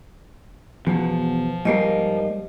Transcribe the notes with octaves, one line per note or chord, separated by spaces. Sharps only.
E2 B2 F3
G#2 G3 A#3 D#5